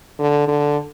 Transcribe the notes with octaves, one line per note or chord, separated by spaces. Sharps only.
D3
D3